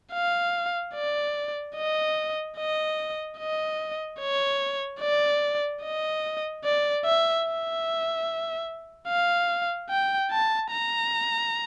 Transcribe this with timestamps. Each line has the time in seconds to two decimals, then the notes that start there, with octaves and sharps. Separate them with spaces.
0.13 F5
0.95 D5
1.76 D#5
2.58 D#5
3.39 D#5
4.20 C#5
5.01 D5
5.83 D#5
6.64 D5
7.05 E5
7.46 E5
9.08 F5
9.90 G5
10.31 A5
10.72 A#5